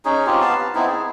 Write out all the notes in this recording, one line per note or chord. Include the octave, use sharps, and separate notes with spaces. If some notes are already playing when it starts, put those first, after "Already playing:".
C#4 D#4 G#4
C4 F4 G4
B3 F5 A5
B4
B3 C4 D#4 E4
G#4